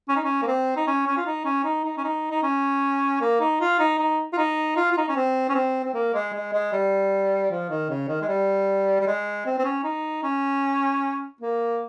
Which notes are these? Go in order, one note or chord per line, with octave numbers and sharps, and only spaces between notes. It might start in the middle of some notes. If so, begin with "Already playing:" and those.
C#4
D#4
C#4
A#3
C4
D#4
C#4
C#4
F4
D#4
C#4
D#4
D#4
C#4
D#4
D#4
C#4
A#3
D#4
F4
D#4
D#4
F4
D#4
F4
F4
D#4
C#4
C4
C#4
C4
C4
A#3
G#3
G#3
G#3
G3
F3
D#3
C#3
D#3
G#3
G3
G3
G#3
C4
C4
C#4
D#4
C#4
A#3